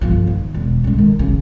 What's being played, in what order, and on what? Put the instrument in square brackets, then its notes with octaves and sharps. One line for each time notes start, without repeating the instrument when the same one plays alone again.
[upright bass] G1 F3
D#3
E1
C#3 G#3
D#3
C#3